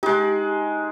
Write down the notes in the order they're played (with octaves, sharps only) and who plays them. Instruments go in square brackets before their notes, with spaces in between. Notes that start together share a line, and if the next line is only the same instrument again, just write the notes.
[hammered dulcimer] G#3 D#4 [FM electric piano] G4